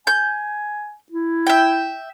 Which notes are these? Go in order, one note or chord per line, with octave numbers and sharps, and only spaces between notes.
G#5 G6
E4
E5 G5